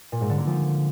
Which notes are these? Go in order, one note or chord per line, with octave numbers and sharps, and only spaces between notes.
A#2
G#2
D3
A#3
F3